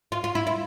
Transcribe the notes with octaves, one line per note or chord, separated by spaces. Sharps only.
F4
F4
E4
E4